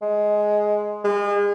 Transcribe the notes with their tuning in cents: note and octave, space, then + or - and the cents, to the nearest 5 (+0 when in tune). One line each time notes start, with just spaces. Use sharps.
G#3 +10
G#3 -35